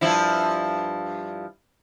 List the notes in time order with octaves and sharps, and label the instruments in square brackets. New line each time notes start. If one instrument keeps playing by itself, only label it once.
[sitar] G2 F3 E4